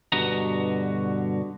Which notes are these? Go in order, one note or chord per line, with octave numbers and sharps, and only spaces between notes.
G2 B2 D3 F#4 D#5 A#5